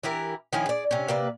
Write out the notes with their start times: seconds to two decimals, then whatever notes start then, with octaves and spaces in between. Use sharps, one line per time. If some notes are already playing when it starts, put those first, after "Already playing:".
0.03 E3 E4 G4 A#4
0.53 D#3 F3 C#4 E4
0.66 G#4 D5
0.91 C3 C#4
1.08 C3 A#3 B4 D5